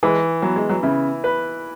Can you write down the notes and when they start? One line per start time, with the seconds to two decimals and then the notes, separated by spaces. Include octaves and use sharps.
0.03 E3 G#3
0.42 F#3 B3
0.56 G#3
0.69 F#3
0.83 C#3 E4
1.24 B4